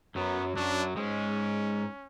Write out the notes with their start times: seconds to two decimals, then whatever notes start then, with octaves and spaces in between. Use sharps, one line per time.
0.15 F#2 F#3 B3
0.56 F#2 F#3 D4
0.96 G#2 G#3 C#4